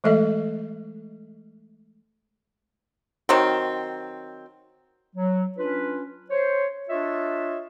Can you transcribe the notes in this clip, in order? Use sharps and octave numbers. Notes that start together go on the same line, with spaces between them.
E3 G#3 A3 A4 D#5 E5
D#3 F#3 C4
F#3
C#4 D4 F4 B4
C5 C#5
D4 F4 C#5 D#5 E5